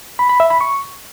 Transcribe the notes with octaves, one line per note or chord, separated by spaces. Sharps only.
B5
B5
E5
B5
C#6